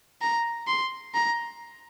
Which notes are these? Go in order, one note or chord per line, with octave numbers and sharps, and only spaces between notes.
A#5
C6
A#5